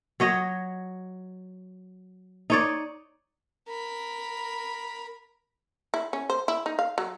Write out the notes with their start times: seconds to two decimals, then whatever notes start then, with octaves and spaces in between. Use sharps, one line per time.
0.20 F#3 C#5 D#5
2.50 D#4 C#5 D5
3.68 A#4 B5
5.94 E4
6.13 C#4
6.30 C5
6.48 E4
6.66 D#4
6.79 F5
6.98 F#3